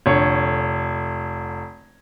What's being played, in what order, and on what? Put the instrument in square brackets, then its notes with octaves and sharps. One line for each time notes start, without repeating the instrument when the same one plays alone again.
[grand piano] F1 D3 C#5